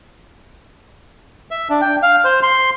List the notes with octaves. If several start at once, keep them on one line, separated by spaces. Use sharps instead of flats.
E5
D4
G5
F5
C5
C6